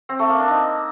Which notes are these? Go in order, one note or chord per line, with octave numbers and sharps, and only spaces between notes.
C4
A3
A#3
D4
D#4